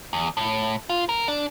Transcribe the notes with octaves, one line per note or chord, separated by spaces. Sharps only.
E2
A2
F4
A#4
D4